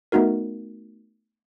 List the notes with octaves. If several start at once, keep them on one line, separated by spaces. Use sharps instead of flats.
A3 B3 D#4 F#4 A#4